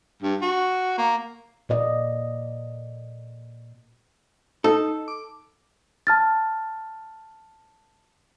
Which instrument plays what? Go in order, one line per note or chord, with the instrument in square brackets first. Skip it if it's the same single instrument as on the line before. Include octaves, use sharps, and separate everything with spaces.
[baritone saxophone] G2
F#4
A#3
[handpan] A#2 D5 D#5
[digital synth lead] D#4 [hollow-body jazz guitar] A4
[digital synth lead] D6
[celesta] A5 F6 A6